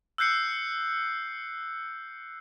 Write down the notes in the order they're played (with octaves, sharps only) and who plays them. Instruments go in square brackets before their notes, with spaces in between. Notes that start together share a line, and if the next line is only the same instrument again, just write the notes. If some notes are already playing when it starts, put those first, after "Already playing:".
[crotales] E6 F#6 G6 C7 C#7